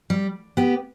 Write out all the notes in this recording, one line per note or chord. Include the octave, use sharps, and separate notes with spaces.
G3
B3 G4